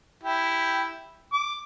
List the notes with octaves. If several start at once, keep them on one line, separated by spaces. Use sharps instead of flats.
E4 G4
D6